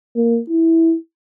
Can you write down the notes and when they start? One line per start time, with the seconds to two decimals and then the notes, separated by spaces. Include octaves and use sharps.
0.16 A#3
0.49 E4